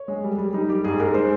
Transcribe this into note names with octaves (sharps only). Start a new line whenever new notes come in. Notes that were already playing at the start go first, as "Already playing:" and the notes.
Already playing: C#5
G#3
G3
G3
G3 D#4
G3 G4
G#2 G#4
G#2 A#4
G#3 C5